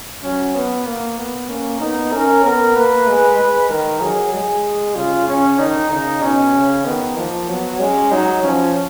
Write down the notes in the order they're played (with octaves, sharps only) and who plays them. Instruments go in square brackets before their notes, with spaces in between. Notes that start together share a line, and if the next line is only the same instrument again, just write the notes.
[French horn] F#3 [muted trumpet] C#4
[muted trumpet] B3
A#3
B3
[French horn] A#3 [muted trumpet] C#4
[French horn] B3 [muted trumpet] D#4
[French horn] C#4 [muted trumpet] A#4
[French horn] B3 [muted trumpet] A#4
[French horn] A#3 [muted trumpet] B4
[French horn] G#3
G#3
[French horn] D#3 [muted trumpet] A#4
[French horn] F#3 [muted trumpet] G#4
[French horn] G#3 [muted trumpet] G#4
[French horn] C#3 [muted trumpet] F4
[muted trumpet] C#4
[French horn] D#3 [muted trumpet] D#4
[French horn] C#3 [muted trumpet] D#4
[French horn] B2 [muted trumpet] C#4
[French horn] C#3
[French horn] D#3 [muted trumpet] B3
[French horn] F3 [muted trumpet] A#3
[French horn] F#3 [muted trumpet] B3
[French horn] G#3 [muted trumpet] C#4
[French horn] F#3 [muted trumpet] D#4
[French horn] F3 [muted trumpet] C#4